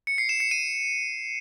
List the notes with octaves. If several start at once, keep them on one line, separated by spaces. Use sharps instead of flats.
C#7
C7
E7
C#7
D#7